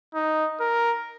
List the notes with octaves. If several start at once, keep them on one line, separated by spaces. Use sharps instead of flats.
D#4
A#4